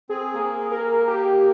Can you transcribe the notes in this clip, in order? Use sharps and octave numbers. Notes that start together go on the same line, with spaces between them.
C4 G#4
A#3 G#4
A#4
G4